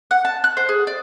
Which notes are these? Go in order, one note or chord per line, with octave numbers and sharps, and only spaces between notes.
F#5
A5
F#6
C5
G#4
D5